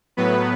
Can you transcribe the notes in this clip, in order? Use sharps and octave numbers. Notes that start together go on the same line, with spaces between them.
A2 F#3 B3 B4